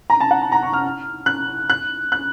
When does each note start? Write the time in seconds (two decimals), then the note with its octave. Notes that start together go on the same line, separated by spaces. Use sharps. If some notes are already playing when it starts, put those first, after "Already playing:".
0.10 A#5
0.20 A5
0.31 F#5
0.42 A5
0.52 A#5
0.63 C#6
0.73 F6
1.26 F#6
1.70 F#6
2.12 F#6